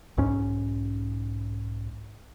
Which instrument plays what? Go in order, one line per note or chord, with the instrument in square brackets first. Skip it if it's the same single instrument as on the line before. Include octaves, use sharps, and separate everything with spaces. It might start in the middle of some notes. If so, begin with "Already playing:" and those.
[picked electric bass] B1 G#2 C#4